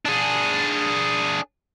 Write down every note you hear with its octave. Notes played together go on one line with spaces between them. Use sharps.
D4 G#4